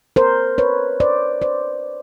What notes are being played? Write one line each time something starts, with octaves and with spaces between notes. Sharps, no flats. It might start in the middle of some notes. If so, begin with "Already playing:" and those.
A#4 C5
B4 C#5
C5 D5
C5 D5